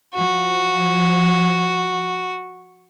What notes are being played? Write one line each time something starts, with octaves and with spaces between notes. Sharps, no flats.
F3 F#4